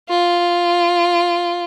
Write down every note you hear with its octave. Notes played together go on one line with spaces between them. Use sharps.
F4